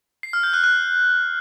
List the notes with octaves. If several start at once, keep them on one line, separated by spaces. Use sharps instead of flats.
C7
F6
G6
F#6
F#6